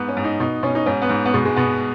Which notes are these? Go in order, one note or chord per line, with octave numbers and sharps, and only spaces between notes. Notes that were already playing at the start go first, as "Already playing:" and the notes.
Already playing: G#2 B3
C#4
G#2
D#4
B2 D#4
B2 C#4
D#4
G#2 C#4
B3
G#2
B3
B2 G#3
G#3
B2 B3